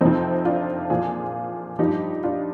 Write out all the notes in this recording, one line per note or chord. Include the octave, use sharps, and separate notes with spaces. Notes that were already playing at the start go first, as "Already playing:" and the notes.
F2 C3 F3 C4 D#4
D4 F4
A#2 F3 F4 G#4
G2 F3 D#4 G4
D4 F4